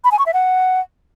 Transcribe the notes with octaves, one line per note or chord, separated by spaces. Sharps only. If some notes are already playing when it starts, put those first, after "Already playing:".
B5
G#5
C#6
E5
F#5